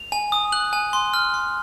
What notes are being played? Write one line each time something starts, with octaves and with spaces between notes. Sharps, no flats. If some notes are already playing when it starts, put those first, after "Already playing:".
Already playing: F7
G#5
D#6
F#6 F#7
G#5
C6
F6
C6